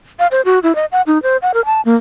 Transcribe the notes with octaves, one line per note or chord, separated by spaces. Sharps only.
F5
C5
F#4
E4
D#5
F#5
D#4
C5
F#5
A#4
A5
A#3